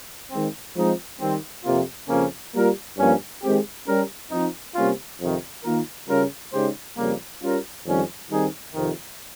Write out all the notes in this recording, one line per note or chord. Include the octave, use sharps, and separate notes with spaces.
D#3 G#3 C4
F3 G#3 C4 D#4
D#3 G3 C4
F2 C3 F3 A#3 F4
F2 C#3 F3 A#3 C#4
G3 A#3 F4 A#4
G2 F3 A#3 C#4
D#3 G#3 C4 G4
G3 C#4 G4 A#4
F3 C4 D#4
C3 G3 A#3 C#4 F4
F2 C3 D#3
D#3 A#3 F4 A#4
C#3 G3 C#4 F4 A#4
C#3 G#3 D#4 G4 C5
F2 C#3 G3 A#3
G3 C#4 F4 A#4
F2 D#3 G3 C#4
D#3 G3 C4 D#4 G#4
F2 C3 D#3